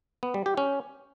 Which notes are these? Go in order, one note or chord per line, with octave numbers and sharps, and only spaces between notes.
B3
G3
G4
C#4